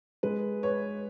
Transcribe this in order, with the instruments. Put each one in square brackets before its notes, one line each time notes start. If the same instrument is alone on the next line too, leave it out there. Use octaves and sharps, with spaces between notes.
[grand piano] G#3 [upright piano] B4
[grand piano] B4 [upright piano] C#5